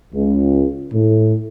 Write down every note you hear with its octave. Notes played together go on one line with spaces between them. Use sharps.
C#2
A2